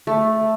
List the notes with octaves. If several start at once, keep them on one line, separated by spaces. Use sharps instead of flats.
A3